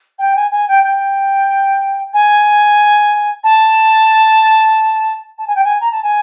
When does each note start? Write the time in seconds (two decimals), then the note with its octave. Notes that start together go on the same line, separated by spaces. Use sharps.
0.19 G5
0.36 G#5
0.51 G#5
0.68 G5
0.84 G5
2.14 G#5
3.44 A5
5.38 A5
5.47 G#5
5.55 G5
5.64 G#5
5.81 A#5
5.92 A5
6.03 G#5